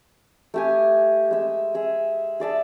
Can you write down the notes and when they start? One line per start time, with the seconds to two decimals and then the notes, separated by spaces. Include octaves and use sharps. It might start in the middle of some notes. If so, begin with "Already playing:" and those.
0.54 A3 G4 G#5
1.31 G#3 E5
1.75 G#4 E5
2.40 G#4 D5 E5 A5